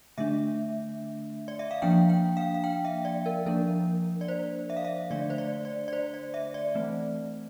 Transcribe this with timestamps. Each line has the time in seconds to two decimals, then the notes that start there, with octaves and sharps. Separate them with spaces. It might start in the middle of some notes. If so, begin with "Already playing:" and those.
0.18 D3 A3 D4 E5
1.48 D5
1.59 E5
1.71 F5
1.82 F3 A#3 D4 G5
2.10 G5
2.37 F5
2.54 F5
2.64 G5
2.85 E5
3.05 D5
3.26 A#4
3.46 F3 A#3 D4 A#4
4.21 D5
4.28 C5
4.70 E5
4.77 F5
4.85 E5
5.10 D3 A3 D4 D5
5.30 C5
5.38 D5
5.65 D5
5.88 D5
5.93 C5
6.14 D5
6.34 E5
6.54 D5
6.75 E3 A3 C4